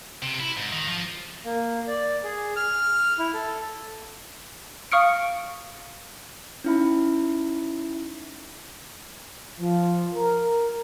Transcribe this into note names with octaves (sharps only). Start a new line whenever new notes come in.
C3
E4
G#2
D#3
F3
A#3
D5
G#4
F6
E4
A4
F5 C#6 D#6 F6 C#7 D7
C#4 D#4 E4 E5 B5
F3
A#4